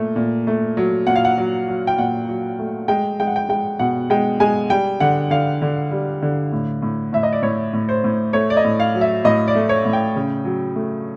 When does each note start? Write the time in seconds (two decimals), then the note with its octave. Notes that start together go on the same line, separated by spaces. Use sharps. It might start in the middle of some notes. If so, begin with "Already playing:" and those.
Already playing: A#2 A3
0.16 A#2
0.47 A3
0.77 F#3
1.07 A#2 F#5
1.16 F5
1.25 F#5
1.38 F#3
1.68 F#3
1.87 G5
1.98 A#2 F#5
2.29 F#3
2.59 A3
2.88 G#3 G5
3.20 G#3 G5
3.27 F#5
3.36 G5
3.49 G#3 G5
3.79 B2 F#5
4.10 G#3 G5
4.40 G#3 G#5
4.70 G3 G5
5.00 D3 F#5
5.30 D3 F5
5.62 D3
5.91 G3
6.22 D3
6.52 A2
6.82 A2
7.13 A2 E5
7.23 D#5
7.32 D5
7.42 A2 C#5
7.73 A2
7.89 C5
8.04 A2
8.33 A3 C#5
8.50 D5
8.57 D#5
8.65 A2
8.80 F5
8.95 F#3
9.01 E5
9.24 A2 D#5
9.48 D5
9.55 A3
9.69 C#5
9.85 A2
9.93 G5
10.16 C#3
10.45 F#3
10.76 A3